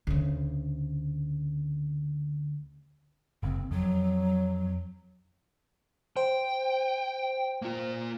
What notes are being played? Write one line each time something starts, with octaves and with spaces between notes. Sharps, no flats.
D2 C#3
F#1 C4
F2 F#3
C5 G5
A#3 F4